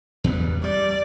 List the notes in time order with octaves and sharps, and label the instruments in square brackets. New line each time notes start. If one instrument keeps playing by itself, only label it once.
[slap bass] E2 G2 B3
[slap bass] G3 [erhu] D5